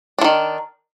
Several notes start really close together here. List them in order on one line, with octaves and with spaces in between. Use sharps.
D4 F3 D#3